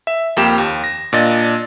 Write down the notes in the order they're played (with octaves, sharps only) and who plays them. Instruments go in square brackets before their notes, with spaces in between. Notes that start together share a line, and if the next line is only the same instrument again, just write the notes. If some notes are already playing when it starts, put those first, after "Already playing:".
[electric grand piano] E5
F2 A#3 G4 E7
D#2
A#6
A#2 D4 D#5 A6